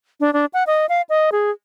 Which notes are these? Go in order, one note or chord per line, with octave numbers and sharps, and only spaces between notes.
D4
D4
F#5
D#5
F5
D#5
G#4